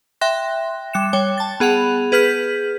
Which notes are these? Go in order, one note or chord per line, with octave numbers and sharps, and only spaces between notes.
E5 G5 C6 F#6 A#6
G3 F#6 C#7 E7
G3 C#5 G5
A5 A6
B3 G#4 F#5 B5 F7
G#4 B4 F6 G6 B6